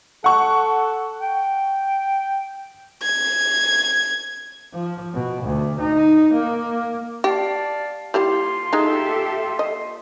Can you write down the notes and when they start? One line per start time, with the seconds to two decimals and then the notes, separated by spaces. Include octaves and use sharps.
0.24 A4 F#5 C#6
1.21 G5
3.03 G#6
4.73 F3
5.14 B2
5.44 D2
5.80 D#4
6.33 A#3
7.24 G4 D5 F5 A5
8.14 G3 A#3 E4 F4 G4 C6
8.73 G#3 D#4 G4 A4 E5
9.59 D#5